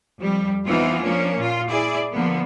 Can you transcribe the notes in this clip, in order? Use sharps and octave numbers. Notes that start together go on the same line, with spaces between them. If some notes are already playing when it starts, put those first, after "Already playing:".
F2 G3
E3 B3 C4 D#4 F4
F3 A#3 C#4 D4
A#2 F4
E4 G#4 D5
D3 F3 A#3 B3